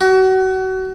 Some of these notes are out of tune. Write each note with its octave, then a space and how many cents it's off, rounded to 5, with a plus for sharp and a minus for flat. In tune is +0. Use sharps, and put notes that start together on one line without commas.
F#4 +30